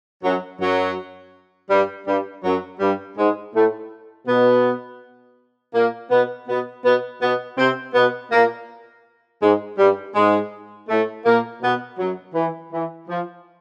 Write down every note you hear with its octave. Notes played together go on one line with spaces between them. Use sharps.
F#2 F#3
F#2 F#3
G2 G3
G2 G3
F#2 F#3
G2 G3
G#2 G#3
A2 A3
B2 B3
A#2 A#3
B2 B3
B2 B3
B2 B3
B2 B3
C3 C4
B2 B3
A#2 A#3
G#2 G#3
G2 G3
G#2 G#3
A2 A3
A#2 A#3
B2 B3
F#2 F#3
E3
E3
F3